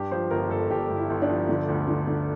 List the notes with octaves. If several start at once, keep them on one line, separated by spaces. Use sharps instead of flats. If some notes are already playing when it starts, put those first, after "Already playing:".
Already playing: G2 G4
F3 C5
G1 A#4
G1 A4
G1 G4
G1
E4
G1
D4
F3
D3
D2
D3
D3